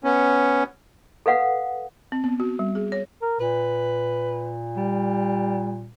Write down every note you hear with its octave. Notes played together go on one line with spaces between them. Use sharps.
B3 C#4
A4 B4 F5 F#5
C4
B3
F#4
G3
G#4
C#5
A#4
A#2 B4
G3